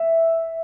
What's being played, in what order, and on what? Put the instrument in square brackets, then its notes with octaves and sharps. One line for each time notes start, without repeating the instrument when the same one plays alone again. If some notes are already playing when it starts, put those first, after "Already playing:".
Already playing: [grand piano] E5